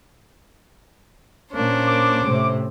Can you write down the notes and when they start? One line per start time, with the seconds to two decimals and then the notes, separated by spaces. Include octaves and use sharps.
1.53 A#2 A#3 C#4 D4 C5
1.87 D6
2.24 A2 C3